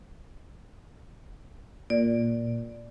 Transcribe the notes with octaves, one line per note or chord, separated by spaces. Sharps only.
A#2 D5